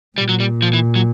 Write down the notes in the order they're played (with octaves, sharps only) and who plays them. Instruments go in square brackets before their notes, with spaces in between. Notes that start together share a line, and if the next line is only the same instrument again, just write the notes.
[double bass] A#2 [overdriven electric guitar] G3
[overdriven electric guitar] F#3
G3
F3
E3
F#3